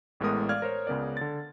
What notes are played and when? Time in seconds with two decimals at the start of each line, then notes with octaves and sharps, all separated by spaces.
0.20 A1 A2 G#3 B3 A#4 D#6
0.49 D5 F5 F6 G#6
0.62 A#4 C5 C#5
0.87 C#2 C#3 B3 A#4 D5
1.17 D3 A6